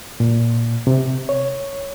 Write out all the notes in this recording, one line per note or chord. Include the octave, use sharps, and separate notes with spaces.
A#2
C3
C#5